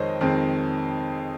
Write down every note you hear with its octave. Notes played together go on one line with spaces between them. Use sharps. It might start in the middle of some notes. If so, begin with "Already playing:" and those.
Already playing: F2 D#3 G#3 C4 C5 C#5 D#5
F2 D#3 G#3 C4